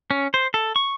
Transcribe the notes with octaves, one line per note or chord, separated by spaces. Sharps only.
C#4
C5
A4
C#6